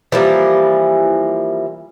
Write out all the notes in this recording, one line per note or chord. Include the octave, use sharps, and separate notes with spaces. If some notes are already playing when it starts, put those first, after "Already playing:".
E3 F3 G3 A#3